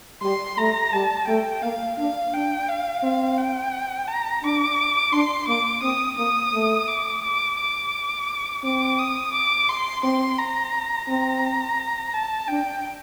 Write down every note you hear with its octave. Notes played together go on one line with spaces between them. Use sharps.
G3 C6
A3 A#5
G3 A5
A3 G5
A#3 F5
D4 F5
D4 G5
F5
C4
G5
A#5
D4 D6
D4 C6
A#3 D6
C4 D#6
A#3 D#6
A3
D6
D6
D6
C4 D6
D#6
D6
C6
C4 C6
A#5
C4 A#5
A5
D4 G5